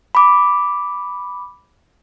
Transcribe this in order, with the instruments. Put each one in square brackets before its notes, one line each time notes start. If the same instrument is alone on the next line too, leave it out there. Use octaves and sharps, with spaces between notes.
[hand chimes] B5 D6